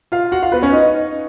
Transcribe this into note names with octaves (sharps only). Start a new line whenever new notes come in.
F4 F5
F#4 F#5
F4 F5
B3 B4
C#4 C#5
D#4 D#5